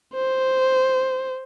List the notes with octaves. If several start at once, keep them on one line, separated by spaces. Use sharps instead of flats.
C5